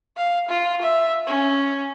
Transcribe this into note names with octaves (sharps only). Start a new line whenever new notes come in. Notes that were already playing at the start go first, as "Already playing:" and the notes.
F5
F4
E5
C#4